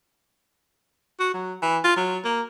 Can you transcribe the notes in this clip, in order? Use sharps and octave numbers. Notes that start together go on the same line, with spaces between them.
F#4
F#3
E3
F4
F#3
A#3